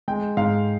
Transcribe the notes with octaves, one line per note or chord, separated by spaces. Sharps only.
G#3 G5
G#2 F5